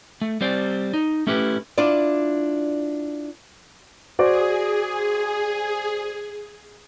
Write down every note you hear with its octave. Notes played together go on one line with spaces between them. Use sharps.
A3
G3 C4 C5 D5
D#4
A3 C#4 E4 G4 B4
D4 E4 F4 D5
F#4 G#4 C5 D5